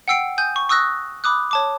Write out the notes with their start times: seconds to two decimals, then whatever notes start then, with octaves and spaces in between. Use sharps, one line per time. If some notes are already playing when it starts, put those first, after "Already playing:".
0.08 F#5 G5 E6 C7 D7
0.38 G#5 D#6 G6
0.56 C#6
0.69 C#6 D#6 E6 F#6 A#6
1.24 B5 D6 D#6 F#6
1.51 C#5 A5 D6